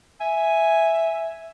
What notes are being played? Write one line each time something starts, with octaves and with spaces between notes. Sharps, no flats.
E5 G#5